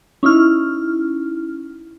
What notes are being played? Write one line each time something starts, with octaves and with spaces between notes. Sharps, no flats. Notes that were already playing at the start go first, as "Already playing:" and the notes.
C#4 D#4 E4 F6